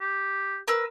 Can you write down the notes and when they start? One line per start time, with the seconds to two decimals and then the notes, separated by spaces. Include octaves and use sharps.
0.01 G4
0.68 A#4 B4 E6